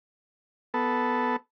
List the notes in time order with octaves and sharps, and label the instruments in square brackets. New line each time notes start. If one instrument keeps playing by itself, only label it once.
[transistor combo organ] B3 A4